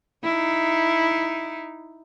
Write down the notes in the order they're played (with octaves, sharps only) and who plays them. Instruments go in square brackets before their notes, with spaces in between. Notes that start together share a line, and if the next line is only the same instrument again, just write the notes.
[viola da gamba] D#4 E4